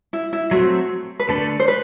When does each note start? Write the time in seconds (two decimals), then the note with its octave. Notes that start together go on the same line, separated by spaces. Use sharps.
0.13 E4
0.33 E4
0.51 F#3 A3 C4 F#4
1.20 B4
1.29 D3 A3 D4 A4
1.60 C5
1.68 B4